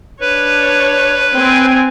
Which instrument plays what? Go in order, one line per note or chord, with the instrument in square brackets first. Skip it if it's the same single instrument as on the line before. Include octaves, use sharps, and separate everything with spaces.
[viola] D4 C#5 [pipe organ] B4
[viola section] C4 G#5